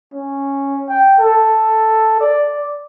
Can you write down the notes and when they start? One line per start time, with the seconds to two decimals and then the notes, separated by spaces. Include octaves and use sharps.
0.13 C#4
0.89 G5
1.20 A4
2.20 D5